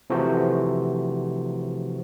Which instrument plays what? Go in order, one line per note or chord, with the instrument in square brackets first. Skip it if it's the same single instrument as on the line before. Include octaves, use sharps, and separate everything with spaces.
[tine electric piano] C3 E3 F3 A3 F#4 C5